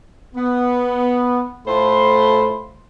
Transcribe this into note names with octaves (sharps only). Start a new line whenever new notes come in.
B3
A2 A3 F4 C5 B5 C6